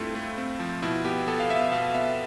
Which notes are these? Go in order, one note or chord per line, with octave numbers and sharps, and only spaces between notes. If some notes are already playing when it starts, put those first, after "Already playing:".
Already playing: G2 A3 C4 E4 F4
A3
C4
F3
B2 E4
B3 G4
B3 A4
F5
B3 E5
B2 F5
B3 E5